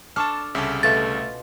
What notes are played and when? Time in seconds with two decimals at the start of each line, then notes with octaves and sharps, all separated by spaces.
0.16 D4 A4 A5 C#6 F6
0.55 C2 C#3 C#4 G4 A4 E5
0.83 B2 A3 F4 A6